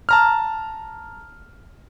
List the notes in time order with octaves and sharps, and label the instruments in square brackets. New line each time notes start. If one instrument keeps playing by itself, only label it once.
[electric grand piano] A5 A#5 F6